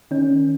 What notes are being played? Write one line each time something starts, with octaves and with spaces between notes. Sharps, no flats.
D#3 C#4